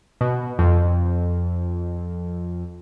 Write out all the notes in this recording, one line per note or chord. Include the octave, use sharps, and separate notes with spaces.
B2
F2